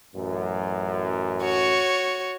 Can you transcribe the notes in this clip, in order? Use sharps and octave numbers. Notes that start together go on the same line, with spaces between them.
A1 F#2
F#4 C#5